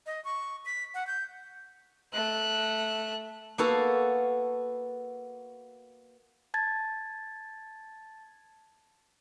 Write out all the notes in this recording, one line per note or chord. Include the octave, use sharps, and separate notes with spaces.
D#5
C#6
B6
F#5
G6
A3 F#6
A#3 B3 F#4 A4 F5
A5 G#6 A6